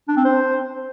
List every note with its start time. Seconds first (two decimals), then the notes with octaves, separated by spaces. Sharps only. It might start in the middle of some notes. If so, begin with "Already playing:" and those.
0.08 D4
0.16 C4
0.24 C5